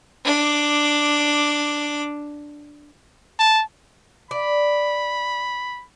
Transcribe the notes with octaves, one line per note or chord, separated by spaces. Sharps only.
D4 D6
A5
D5 B5